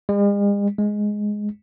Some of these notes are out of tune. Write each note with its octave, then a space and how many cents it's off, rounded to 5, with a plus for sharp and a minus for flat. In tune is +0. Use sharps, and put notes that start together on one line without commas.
G#3 -45
G#3 +5